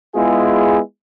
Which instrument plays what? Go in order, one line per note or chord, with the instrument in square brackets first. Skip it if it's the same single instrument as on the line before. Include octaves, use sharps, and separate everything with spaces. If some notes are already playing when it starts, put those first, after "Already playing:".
[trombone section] G#3 B3 E4 F4 G#4